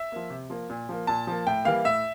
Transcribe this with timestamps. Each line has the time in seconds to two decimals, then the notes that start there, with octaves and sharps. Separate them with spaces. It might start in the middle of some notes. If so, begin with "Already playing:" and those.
Already playing: E5
0.12 F3 A#3
0.30 C3
0.50 F3 A#3
0.70 A#2
0.89 F3 A#3
1.07 A#2 A5
1.27 F3 A#3
1.47 A2 G5
1.65 E3 G3 A#3 F5
1.85 A2 E5